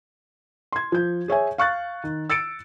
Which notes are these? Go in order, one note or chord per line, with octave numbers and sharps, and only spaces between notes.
C6 G#6
F3 G6
G#4 C#5 E5 G#5
F5 C#6 F#6 A6
D#3
E6 A6 C#7 D7